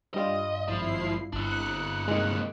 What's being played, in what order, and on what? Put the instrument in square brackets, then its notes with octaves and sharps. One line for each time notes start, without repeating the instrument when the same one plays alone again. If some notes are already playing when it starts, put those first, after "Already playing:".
[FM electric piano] G2 G3 F4 [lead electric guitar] D#5
[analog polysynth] G#1 E4 C7 [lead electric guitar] F3
[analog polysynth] G1 F#6 C#7 [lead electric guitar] D4 E4
[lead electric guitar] C3 A#3 [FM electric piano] D#3 G#3